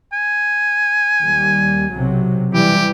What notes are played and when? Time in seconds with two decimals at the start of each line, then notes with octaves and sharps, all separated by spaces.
0.13 G#5
1.23 D#2 G3
1.91 B1 C3 F#3
2.54 E3 G3 G4